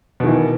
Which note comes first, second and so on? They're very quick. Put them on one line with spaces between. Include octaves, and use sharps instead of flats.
B2 D#3 E3